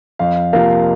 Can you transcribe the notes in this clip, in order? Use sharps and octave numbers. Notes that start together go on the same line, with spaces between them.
F2 F5
C3 F3 A#3 F5